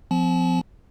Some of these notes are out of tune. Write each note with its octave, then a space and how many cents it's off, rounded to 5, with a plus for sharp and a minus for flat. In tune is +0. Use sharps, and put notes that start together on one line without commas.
F3 +10 C4 -35 A5 -45